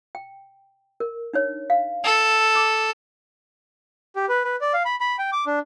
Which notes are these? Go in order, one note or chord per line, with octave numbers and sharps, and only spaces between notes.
G5
A#4
D4 D#4 C#5
F5
A4
D6
G4
B4
B4
D5
F5
B5
B5
G5
D6
D4